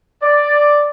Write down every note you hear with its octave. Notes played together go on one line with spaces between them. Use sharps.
D5